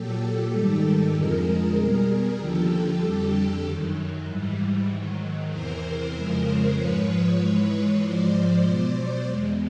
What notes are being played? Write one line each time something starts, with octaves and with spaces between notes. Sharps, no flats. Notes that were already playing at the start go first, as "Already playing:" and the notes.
Already playing: A#2 F#3 G4 A4
G#2 D#3 G3
F2 D3 F3 G#3 G#4 A#4
B2 G3
D#2 D3 F3 G4 A4
F2 D3 G3
F#2 D#3 F#3
G#2 E3 G3
G#2 D#3 F#3
E2 C3 E3 A#4 C5
F2 C#3 F3 G#3
G#2 F3 G#3 B4 C#5
G#2 E3 G#3
G#2 F3 G#3 C5 D5
B2 F#3
E2 B2 G#3